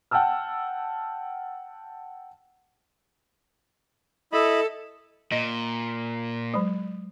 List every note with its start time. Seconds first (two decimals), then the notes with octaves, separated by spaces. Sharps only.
0.11 F#5 G5 A5 E6 F6
4.32 E4 A4 D#5 B5
5.32 A#2 D#5
6.54 F#3 G#3